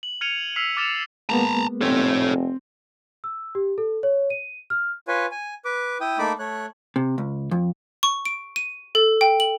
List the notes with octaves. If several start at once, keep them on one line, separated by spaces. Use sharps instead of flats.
F#7
F6 G#6 C#7 D#7 F7
E6 F6 B6 C7 F7
D6 F6 A6 C#7 E7 F7
G#3 A#3 B3 A5 A#5
F1 C4 A4 C#5
E6
G4
A4
C#5
D#7
F6
F4 B4 C#5 G#5
G#5
B4 D6
E4 G5 D#6
A3 A#3 D#4 A5 B5 D6
A3 C#5 F#6
C3
C#2
F2
C#6
D7
D#7
A4
G5
F#7